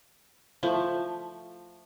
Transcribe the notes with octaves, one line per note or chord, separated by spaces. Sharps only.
F3 A3